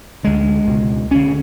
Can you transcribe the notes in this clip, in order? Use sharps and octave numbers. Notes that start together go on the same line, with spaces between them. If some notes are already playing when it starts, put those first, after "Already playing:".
D2 D3 G#3
C#2 B2
D2 D3 C#4